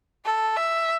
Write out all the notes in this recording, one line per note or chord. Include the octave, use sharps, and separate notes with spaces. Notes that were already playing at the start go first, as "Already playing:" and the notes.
A4
E5